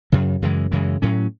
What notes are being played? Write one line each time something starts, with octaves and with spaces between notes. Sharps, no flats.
F#2 C#3 F#3
F#2 C#3 E3 G#3
F#2 C#3 E3 G#3
A2 F#3 C#4